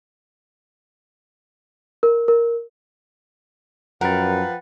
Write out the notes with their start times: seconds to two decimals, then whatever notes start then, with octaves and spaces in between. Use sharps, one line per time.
2.03 A#4
2.28 A#4
4.01 F#2 F3 A#4 B4 F#5 G5 A6